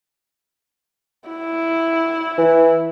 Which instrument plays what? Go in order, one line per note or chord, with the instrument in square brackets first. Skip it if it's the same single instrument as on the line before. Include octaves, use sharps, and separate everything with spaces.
[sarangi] E4
[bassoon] E3